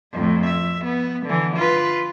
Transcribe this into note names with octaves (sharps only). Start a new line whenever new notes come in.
F2 A2
E5
B3
D3 E3
F4 B4